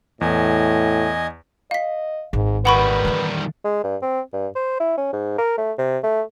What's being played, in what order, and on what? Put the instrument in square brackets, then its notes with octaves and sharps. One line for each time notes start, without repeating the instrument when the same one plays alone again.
[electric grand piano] E2 [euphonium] A2 [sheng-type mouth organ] D#5 G#5
[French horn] D#5 [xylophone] F5 B6
[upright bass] G#1 [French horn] G#2
[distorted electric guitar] D#3 G3 [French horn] B4 [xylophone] F#5 B5 C#6
[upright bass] E3 A#3
[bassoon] G#3
G2
C4
G2
C5
E4
C#4
G#2
A#4
A3
C3
A3